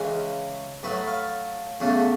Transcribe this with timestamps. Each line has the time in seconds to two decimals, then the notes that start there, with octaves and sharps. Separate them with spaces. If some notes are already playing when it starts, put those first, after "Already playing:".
Already playing: C#2 C#3 E3 G#3
0.83 A2 F#3 A3 B4
1.07 F5
1.80 E2 C#3 F#3 A3